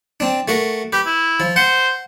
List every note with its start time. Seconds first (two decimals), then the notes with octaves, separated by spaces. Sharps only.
0.20 C4 D4
0.48 A3 F#4 A#4
0.93 G4 B4
1.06 E4
1.40 F3
1.56 C5 F#5